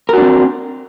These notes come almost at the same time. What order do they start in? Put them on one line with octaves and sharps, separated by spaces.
A#4 F#4 D4 C4